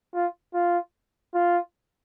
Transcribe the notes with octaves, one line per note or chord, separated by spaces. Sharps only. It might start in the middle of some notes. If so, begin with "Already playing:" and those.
F4
F4
F4